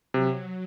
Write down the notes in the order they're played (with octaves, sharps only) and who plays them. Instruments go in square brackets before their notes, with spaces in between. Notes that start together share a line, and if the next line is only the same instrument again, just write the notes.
[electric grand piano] C3 [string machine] F#3